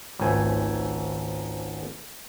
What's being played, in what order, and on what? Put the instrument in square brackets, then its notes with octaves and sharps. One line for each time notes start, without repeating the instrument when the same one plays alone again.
[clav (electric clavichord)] G#1 C#2 G#2 A3 G#5